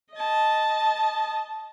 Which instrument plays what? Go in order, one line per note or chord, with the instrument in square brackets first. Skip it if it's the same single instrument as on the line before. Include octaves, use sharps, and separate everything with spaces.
[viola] D#5 A5